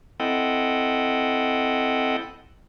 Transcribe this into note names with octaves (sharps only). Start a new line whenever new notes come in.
C4 E4 A4 D#5 F#5 G5